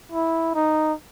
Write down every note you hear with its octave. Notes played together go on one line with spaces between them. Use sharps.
E4
D#4